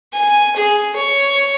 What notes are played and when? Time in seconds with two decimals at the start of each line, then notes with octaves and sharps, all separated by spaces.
0.13 G#5
0.56 G#4
0.96 C#5